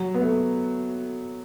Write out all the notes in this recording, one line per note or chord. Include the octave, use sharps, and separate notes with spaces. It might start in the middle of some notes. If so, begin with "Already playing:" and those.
Already playing: F#3
B3
A3